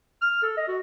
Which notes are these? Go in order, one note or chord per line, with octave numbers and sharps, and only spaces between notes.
F6
A4
D#5
F#4